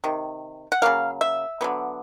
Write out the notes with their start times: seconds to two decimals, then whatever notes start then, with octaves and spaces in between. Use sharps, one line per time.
0.04 C3 D#3
0.72 F#5
0.82 C#3 F#3 A#3 F5
1.21 E5
1.61 D3 F#3 B3